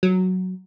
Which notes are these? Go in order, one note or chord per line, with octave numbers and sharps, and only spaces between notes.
F#3